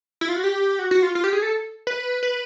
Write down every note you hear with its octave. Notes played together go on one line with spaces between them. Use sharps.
E4
F4
F#4
G4
F#4
F#4
F4
F4
G4
G#4
A4
B4
B4